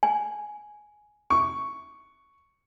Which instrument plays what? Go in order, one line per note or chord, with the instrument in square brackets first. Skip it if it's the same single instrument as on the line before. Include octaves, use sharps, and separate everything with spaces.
[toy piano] G#5
[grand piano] C#6